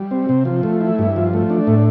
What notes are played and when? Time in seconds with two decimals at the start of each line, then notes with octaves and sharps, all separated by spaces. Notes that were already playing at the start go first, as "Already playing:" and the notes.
Already playing: G3
0.11 C4
0.29 C3
0.45 F3
0.63 A3
0.81 E4
0.99 G2
1.16 F3
1.33 A3
1.50 D4
1.67 A2